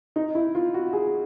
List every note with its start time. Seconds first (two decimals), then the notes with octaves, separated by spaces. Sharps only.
0.16 D#4
0.35 E4
0.55 F4
0.74 F#4
0.93 G#4